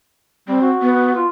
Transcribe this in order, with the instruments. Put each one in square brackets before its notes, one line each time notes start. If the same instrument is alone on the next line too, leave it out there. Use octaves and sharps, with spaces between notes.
[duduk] G3 [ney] C4
[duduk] F#4
[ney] B3
[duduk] F4